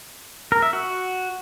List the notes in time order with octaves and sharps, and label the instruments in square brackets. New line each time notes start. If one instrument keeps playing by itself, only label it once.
[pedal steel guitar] A#4
E5
F#4